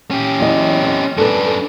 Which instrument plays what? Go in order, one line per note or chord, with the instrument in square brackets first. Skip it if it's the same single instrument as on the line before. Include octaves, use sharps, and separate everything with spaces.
[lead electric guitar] C#4 G4
[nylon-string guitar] E2 F#3 D#5
C4 D#5
[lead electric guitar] F#2 D4 [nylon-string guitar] A4 B4